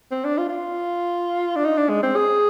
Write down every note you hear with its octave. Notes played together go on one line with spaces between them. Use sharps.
C4
D4
F4
F4
D4
D#4
D4
G#3
C4
G#4